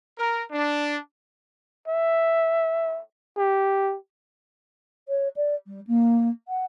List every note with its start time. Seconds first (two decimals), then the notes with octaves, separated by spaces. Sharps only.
0.18 A#4
0.51 D4
1.88 E5
3.37 G4
5.08 C#5
5.36 D5
5.66 G3
5.87 A#3
6.48 F#5